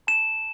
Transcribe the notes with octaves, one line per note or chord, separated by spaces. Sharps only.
A5 E7